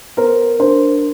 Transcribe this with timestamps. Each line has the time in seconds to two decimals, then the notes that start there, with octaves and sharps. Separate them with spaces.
0.17 B3 A#4 C5
0.59 D4 A#4 C5